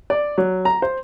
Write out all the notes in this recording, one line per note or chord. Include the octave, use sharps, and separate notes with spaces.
D5
F#3
A#5
C5